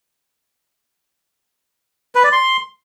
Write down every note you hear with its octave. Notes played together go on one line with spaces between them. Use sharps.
B4
D5
C6